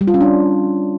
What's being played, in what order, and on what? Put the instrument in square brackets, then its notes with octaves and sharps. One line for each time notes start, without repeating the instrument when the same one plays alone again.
[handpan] G3
F4
C#4
D4